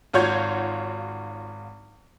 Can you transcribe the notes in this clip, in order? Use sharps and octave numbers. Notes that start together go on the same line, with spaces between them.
G#1 F4 F#4 C#5 G6 G#6